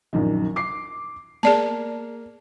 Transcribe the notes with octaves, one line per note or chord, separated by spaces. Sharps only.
A#1 F#2 D#3
D6 C7
A#3 G#4 D5 A5